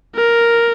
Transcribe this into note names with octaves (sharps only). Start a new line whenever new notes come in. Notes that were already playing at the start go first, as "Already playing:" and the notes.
A#4